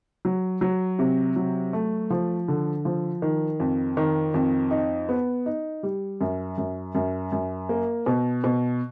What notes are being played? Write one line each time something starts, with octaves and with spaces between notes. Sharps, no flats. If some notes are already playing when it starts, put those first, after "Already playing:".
F#3
F#3
C3
F#3
A3
F3
D3
F3
D#3
F2
D#3
F2
D#4
B3
D#4
G3
F#2
F#2
F#2
F#2
A#3
B2
B2